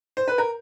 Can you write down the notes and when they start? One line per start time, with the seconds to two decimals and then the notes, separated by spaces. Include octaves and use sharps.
0.17 C5
0.28 B4
0.38 A#4